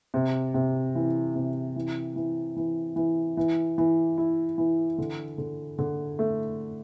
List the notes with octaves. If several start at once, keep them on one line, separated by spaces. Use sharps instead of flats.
C3
C3
E3
C3
E3
E3
E3
E3
E3
E3
E4
E3
D3
D3
D3
A3